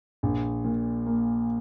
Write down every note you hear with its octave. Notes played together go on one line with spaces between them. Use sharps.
A#1
A#2
A#3